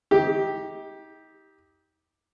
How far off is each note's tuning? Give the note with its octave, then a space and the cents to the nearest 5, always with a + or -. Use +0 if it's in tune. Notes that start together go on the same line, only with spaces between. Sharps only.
D#4 +35 G4 +0